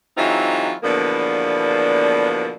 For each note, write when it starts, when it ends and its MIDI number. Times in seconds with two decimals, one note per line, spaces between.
0.17 0.73 52
0.17 0.73 54
0.17 0.73 56
0.17 0.73 60
0.17 0.73 63
0.17 0.73 65
0.83 2.53 40
0.83 2.53 47
0.83 2.53 50
0.83 2.53 53
0.83 2.53 58
0.83 2.53 62